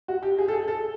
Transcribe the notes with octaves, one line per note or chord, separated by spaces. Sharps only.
F#4
G4
G#4
A4
G#4
A4